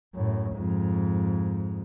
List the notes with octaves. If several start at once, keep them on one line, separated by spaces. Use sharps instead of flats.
F#2 A2
F2 G#2